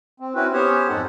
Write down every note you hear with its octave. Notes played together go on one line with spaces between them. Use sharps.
C4
C4 C#4 E4 F#4 B4
B3 C#4 G4 C5 C#5
F2 G#2 G#3 D#4 A4 F#5